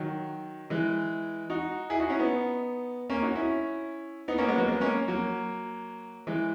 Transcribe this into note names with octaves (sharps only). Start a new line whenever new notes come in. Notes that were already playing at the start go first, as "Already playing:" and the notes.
Already playing: D#3 F#3
E3 G#3
D#4 F#4
E4 G#4
D#4 F#4
C#4 E4
B3 D#4
A#3 C#4
D#4 F#4
C#4 E4
B3 D#4
A#3 C#4
G#3 B3
F#3 A#3
G#3 B3
A#3 C#4
F#3 A#3
E3 G#3